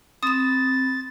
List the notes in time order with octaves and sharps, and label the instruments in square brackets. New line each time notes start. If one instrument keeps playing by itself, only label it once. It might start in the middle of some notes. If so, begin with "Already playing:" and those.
[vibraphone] C4 B5 [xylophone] D#6 E7 [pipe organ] A6